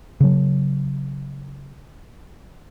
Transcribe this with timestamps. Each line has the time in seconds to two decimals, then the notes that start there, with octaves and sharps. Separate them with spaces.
0.21 C#3 F#3